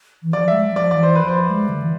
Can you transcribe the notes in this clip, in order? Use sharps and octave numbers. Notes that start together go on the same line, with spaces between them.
E3
F3 D5
F3
G#3 E5
F3 D5
E3 D5
C5
B4
F3
C5
G#3
D3
E3